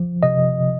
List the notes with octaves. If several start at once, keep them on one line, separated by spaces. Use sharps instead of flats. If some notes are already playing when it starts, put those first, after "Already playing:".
Already playing: F3
C3 D#5